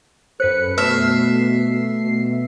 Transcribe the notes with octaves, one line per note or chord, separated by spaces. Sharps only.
F#2 A4 B4 C5 C#7
B2 A3 B4 E5 C7
B2